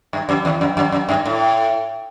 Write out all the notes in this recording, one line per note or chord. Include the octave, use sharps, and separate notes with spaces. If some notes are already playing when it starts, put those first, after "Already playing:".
G2
F#2
E2
F#2
F#2
F#2
G2
A2